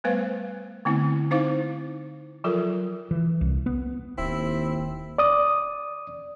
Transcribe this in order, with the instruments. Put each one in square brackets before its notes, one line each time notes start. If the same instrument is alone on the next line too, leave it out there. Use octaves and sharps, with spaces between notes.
[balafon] G3 A3 B3 B4 C5 F5
D3 A3 B3 C4 E4
C4 D#4 E4 C5 F5 D6
F3 F#3 F4 A4 A#4
[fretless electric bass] E3
C2
B3
[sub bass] D1 [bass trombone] D#2 [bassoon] C4 [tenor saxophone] E4
[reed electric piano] D5 D#6